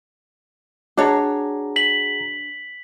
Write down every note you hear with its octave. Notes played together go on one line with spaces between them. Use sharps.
D4 F#4 G#4 C#5 A#5
B6 F#7